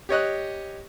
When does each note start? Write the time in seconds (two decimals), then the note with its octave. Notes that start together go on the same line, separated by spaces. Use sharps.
0.09 G4 C#5 D#5 F#6